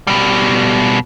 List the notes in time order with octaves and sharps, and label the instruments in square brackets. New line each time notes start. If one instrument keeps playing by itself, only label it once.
[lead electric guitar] B2 G3